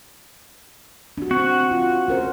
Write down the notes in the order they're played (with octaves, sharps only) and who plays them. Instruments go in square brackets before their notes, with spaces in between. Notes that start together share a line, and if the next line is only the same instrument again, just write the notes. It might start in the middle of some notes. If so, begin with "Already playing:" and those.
[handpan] D4 F#4
[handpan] C4 [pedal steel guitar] F#4
[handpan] F4
C#4 A#4 C5